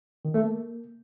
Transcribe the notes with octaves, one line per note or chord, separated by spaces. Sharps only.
D#3
A3
A#3